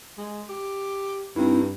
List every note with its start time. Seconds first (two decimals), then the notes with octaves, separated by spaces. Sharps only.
0.18 G#3
0.49 G4
1.36 G2 C4 D#4 E4